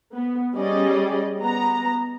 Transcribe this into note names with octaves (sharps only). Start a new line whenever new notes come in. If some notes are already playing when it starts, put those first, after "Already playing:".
B3
G3 C#4 G#4 D5 D#5
B3 A#5